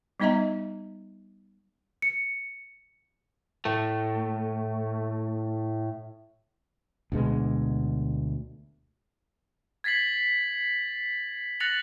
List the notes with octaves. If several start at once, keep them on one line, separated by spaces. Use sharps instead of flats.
G3 B3 D#4 D#5 E5 A#5
C#7
A2 A3
D2 B2 G#3
G#6 A6 B6 C7 F#7
F#6 A6 A#6 C#7 F7 F#7